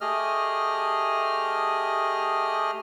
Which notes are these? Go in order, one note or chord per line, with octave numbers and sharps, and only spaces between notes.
A3 G4 G#4 D#5 F6